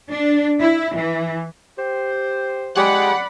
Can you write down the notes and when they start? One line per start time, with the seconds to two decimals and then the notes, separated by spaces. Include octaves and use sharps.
0.11 D4
0.60 E4
0.95 E3
1.78 G4 C5
2.75 G#3 G4 D5 F#5 B5